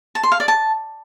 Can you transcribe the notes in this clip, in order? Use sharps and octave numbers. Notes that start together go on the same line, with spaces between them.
A5
C6
F5
D5
A5